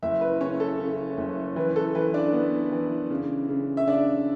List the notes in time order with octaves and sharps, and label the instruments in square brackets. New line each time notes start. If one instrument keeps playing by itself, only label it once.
[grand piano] F#1 E4 E5
B4
C#3 C#4 C#5
A4
C#3
F#1
E3 B4
A4
E3 B4
D4 D5
B3
E3
C#3
C#3
E5
C#3 D4 D5